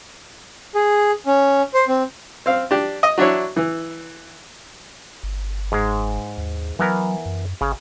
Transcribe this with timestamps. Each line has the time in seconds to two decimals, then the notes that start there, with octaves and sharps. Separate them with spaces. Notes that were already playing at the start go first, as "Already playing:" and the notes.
0.75 G#4
1.26 C#4
1.74 C5
1.88 C4
2.46 C4 F5
2.71 D4 G4
3.03 D#5
3.18 F#3 D4 E4 C#5
3.56 E3
5.23 G1
5.72 G#2 G#3
6.38 D#2
6.79 E3 F#3 B3 A#4
7.26 F#2
7.61 G#1 C#3